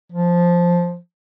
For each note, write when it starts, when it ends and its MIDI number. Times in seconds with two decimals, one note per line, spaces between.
0.12 0.97 53